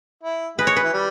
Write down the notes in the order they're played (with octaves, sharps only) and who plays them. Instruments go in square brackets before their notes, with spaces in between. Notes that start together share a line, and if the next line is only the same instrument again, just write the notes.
[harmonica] E4
[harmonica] G#3 [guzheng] B4
[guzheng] C#5
B4
[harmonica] E3
G3